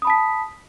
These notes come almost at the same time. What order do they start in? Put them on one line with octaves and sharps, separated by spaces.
D#6 B5 A5 B6